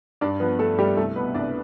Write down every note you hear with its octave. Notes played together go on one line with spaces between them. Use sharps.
G2 D4 D5
F3 B3 B4
G2 A3 A4
G3 A3 G4
C2 A3 A4
B2 B3 B4
C2 D4 D5